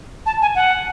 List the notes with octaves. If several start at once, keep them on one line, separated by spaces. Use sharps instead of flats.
A5
G#5
F#5